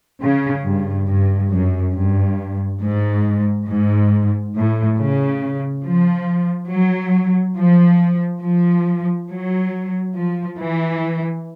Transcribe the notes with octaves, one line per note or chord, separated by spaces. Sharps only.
C#3
G2
G2
F#2
G2
G#2
G#2
A2
C#3
F3
F#3
F3
F3
F#3
F3
E3